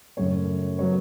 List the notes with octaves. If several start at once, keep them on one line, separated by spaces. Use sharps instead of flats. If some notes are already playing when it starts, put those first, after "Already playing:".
F#2 C#3 F#3 A3 C#5
F#3 B3 C#5